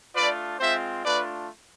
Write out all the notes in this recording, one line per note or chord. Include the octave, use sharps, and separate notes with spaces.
A3 D4 F4 B4 D5
G#3 C4 F4 C5 E5
A3 D4 F4 B4 D5